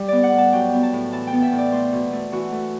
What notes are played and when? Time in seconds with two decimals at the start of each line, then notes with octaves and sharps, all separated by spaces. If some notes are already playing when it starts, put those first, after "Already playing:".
Already playing: G3 G4
0.08 B3 D5
0.23 F#5
0.32 A2
0.38 A5
0.53 F#3 G5
0.73 B3
0.83 A5
0.93 A2
1.12 E3 A5
1.27 G5
1.33 B3
1.42 E5
1.52 A2
1.58 D5
1.72 A3 C5
1.92 B2
2.13 A3
2.32 E3 F#4
2.52 A3